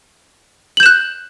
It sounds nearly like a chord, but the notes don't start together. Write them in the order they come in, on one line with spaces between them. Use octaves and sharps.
F#7 G6 E7 F#6